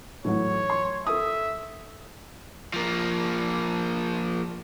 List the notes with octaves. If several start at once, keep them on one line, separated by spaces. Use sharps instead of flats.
A2 E3 F#3 C#5
C6
A4 E5 D#6
F3 A#3